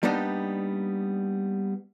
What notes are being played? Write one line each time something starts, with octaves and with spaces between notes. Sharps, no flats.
G3 A#3 B3 D4 D#4